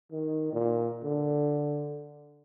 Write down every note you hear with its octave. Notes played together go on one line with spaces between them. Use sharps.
D#3
A#2
D3